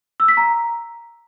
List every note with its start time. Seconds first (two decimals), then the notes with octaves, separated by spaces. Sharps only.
0.20 E6
0.28 B6
0.37 A#5